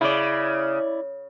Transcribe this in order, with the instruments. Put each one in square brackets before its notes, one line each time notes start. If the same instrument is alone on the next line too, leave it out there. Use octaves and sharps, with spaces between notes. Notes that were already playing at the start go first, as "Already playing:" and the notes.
[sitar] C#3 [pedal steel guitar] E4 D5